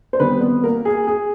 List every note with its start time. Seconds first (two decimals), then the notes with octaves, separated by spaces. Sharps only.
0.13 C5
0.20 D#3 G3 B3 C4 B4
0.41 B3 B4
0.64 A#3 A#4
0.85 G#4
1.07 G#4